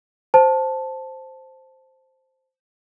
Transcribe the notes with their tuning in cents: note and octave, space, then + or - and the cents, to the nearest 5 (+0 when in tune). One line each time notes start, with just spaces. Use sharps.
C5 +0 A5 +0